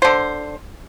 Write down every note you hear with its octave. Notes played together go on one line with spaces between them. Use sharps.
D3 C5